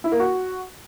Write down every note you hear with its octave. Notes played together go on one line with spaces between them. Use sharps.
E4
A#3
F#4